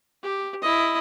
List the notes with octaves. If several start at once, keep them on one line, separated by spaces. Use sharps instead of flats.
G4
E4 D#5